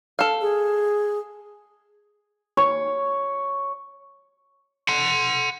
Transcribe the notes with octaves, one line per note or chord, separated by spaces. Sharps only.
A4 F5
G#4
C#5
F#5 C6